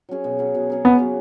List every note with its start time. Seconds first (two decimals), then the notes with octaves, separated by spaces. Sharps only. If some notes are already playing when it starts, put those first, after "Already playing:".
0.09 F#3 C#4 G#4
0.24 B2
0.39 F#3 C#4 G#4
0.55 B2
0.70 F#3 C#4 G#4
0.85 C#3 B3
0.99 F#3 A#3 C#4